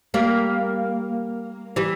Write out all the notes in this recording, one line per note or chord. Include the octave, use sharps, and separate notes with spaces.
G3 A#3
E3 G3